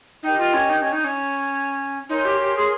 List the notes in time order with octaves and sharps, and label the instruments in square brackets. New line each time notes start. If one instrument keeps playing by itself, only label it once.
[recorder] D#4 [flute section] G4 A#4 D#5 G5
[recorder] F4
C#4
D#4
C#4
D#4
C#4
[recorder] D#4 [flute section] A#4 C#5 G#5 C6
[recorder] G4
G4
G#4